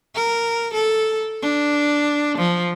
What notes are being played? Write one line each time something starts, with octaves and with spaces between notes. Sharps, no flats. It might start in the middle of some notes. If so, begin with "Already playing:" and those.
A#4
A4
D4
F3